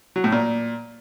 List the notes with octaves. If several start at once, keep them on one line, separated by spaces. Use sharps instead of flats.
F#3
A2
A#2